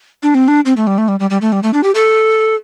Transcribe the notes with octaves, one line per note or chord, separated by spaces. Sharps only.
D4
C4
D4
C4
A3
G3
A3
G3
G3
G3
A3
G3
A3
D4
G4
A4